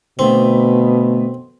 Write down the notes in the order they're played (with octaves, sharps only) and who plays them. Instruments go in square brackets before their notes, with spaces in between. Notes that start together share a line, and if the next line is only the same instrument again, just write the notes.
[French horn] B2 [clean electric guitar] D3 A3 B3 [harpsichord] C4